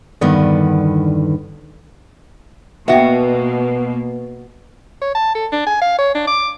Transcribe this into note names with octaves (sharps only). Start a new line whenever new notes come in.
E2 G2 D3 D#3 B3 D5
B2 A#3 B3 F#4 E5 G5
C#5
A5
A4
D4
G#5
F5
C#5
D4
D6